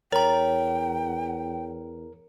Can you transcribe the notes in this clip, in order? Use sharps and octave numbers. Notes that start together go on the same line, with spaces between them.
E2 A#4 C#5 G5 A#5